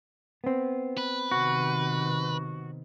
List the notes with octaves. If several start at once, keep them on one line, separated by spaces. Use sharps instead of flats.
B3 C4
B4
C3 D#3 F#4